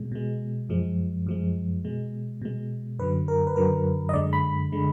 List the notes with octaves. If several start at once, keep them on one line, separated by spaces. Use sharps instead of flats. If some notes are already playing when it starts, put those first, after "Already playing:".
Already playing: B2 G#3
B2 G#3
F#2 F3 G#3
F#2 F3 G#3
B2 G#3
B2 G#3
F#2 D3 F#3 B4
A#4
B4
F#2 D3 F#3 A#4
D#5
F#2 D3 G#3 D5
B5
D3 G#3